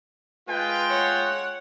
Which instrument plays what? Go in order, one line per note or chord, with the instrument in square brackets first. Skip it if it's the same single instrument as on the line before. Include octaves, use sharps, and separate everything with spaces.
[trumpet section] G#3 F4 G5 [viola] B4
[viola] C#5 F#5